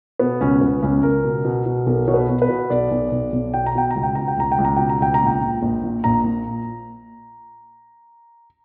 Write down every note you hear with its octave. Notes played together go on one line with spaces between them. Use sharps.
B2 B3
C#2 C#4
C#2 B3
C#2 C#4
C#2 A#4
B2
B2
B2
B1 A#4
B2 C#5
B4
B2
B4
B2
B1 D5
B1
B1
B1
B2 G5
A#5
B2 G5
C#2 A#5
G5
B2 A#5
G5
C#2 A#5
G5
C#2
A#5
B2 G5
A#5
C#2 G5
A#5
A#1
G5
A#2
A#1
A#2
A#1 A#5
A#2